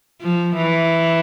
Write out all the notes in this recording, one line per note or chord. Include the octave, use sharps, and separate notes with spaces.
F3
E3